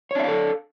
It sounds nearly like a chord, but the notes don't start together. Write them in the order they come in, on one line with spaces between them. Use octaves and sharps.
C#5 D4 E5 F5 A4